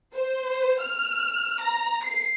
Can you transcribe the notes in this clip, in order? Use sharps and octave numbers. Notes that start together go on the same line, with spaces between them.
C5
F6
A#5
C7